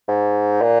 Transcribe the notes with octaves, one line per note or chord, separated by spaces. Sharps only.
G#2
A#2